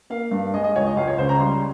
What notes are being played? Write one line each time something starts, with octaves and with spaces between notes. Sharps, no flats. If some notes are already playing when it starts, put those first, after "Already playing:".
A#3 F5
G2
G#3 D#5
D#5
C#2 C#5
D#5
C#2 F5
C#5
C#3 C5
A#5
G3 C6